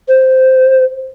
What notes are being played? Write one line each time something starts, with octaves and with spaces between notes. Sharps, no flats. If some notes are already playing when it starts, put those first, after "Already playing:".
C5